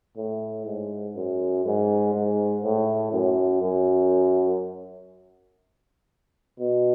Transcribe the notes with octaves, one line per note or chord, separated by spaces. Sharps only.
A2
G#2
F#2
G#2
G#2
A2
F#2
F#2
B2